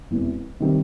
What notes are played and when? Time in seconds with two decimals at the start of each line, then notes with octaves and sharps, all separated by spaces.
0.11 E1 E2 C3 E3
0.60 C3 D#3 G3 C4